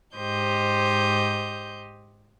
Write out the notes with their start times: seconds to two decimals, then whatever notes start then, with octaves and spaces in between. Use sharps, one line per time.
0.16 G#2 G4 C5 D#5 G6